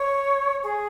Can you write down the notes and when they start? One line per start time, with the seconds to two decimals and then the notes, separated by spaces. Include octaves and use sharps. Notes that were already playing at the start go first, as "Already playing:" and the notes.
Already playing: C#5
0.63 G#4